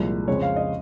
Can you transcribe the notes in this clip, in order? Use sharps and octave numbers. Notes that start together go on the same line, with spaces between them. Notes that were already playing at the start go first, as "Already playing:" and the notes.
Already playing: C2 A#2 F3 G#3
F2 C#3 G#3 C4 C#5
F5
D#5